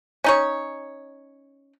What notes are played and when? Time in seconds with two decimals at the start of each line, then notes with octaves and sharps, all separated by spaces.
0.24 C#4 D#4 C#5